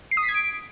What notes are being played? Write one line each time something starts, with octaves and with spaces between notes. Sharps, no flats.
C7
D#6
B6
G#6
D7